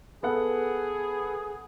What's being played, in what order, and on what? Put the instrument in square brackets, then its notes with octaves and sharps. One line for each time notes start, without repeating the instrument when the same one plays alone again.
[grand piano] B3 A4 F#5 [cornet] G#4